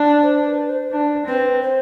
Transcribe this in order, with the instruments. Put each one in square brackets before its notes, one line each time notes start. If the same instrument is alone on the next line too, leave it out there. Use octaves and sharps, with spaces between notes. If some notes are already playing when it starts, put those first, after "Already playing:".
Already playing: [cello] D4
[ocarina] C5
B4
C5
[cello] D4
[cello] C4 [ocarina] B4
[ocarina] C5